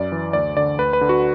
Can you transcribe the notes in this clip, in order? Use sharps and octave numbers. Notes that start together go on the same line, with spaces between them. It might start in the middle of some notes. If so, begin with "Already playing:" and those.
Already playing: F#2 D5
E3
D2 D5
D3 D5
D2 B4
B4
D3
F#4